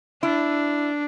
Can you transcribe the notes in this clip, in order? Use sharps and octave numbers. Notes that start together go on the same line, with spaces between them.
D4 E4